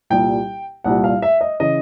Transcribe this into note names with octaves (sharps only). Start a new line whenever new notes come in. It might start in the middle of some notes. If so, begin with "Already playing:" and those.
C2 A#2 G3 G5
C2 A#2 G3 F#5
F5
E5
D#5
C#3 E3 D#5